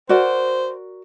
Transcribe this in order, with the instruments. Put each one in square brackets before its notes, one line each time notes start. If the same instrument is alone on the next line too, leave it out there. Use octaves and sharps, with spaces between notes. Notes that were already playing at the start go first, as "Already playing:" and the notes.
[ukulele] F#4 A#4 D5 [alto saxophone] C5